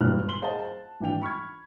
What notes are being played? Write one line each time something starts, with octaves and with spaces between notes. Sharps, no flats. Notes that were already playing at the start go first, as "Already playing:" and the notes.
E1 G2 G4 F6 F#6
C6 F#7 G7
G#4 C5 D#5 F5 F#5 A5
A5
G#1 E3 D4 G5 F7
B5 C#6 F6 G#6